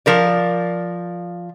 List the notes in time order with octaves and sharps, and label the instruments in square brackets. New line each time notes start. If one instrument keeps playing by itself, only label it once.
[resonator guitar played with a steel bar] F3 A#4 D5